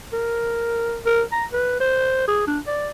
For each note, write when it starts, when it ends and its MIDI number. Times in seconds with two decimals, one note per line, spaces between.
0.13 0.99 70
1.06 1.22 70
1.32 1.45 82
1.53 1.78 71
1.80 2.27 72
2.28 2.47 68
2.47 2.59 62
2.67 2.91 74